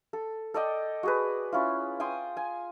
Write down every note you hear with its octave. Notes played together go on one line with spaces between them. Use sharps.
A4
A4 D5 D#5 G5
F#4 G#4 B4
C#4 E4 F4
G5 G#5 C6 D#6
G#5